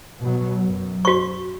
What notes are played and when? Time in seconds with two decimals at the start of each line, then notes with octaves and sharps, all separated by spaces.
0.22 B2 F#3
0.64 F#2
1.05 F#4 C#6